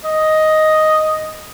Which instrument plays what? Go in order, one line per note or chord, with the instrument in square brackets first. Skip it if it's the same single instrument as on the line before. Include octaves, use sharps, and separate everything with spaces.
[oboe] D#5